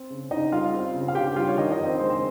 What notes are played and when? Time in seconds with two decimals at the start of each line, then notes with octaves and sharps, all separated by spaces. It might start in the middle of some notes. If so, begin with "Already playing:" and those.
Already playing: C4
0.10 C#3
0.31 C#3 D#4 D#5
0.52 G3 F4 F5
0.73 C4
0.94 C#3
1.08 F5
1.15 C#3 G4 G5
1.36 G3 F4 F5
1.48 C#5
1.57 D#3 D#4 D#5
1.71 D#4 D#5
1.78 F2
1.85 C4 C5
1.99 G#3 C4 C5
2.10 C4 C5